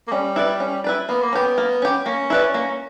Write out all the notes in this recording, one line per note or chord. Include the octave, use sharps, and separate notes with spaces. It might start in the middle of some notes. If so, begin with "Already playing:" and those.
A#3
G3 C#4
E4 B4 D5
C#4
E4 B4 D5
A#3 B3
A#3
B3 C#4 G4
A#3
C#4 G4
A#3 C#4
E4 B4 D5
A#3